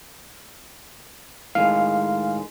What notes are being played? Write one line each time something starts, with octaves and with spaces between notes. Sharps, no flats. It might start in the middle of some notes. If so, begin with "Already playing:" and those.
A2 D#3 G#3 F5